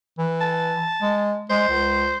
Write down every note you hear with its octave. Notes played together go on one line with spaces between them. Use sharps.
E3
A5
G#3
G#3 C5
C#2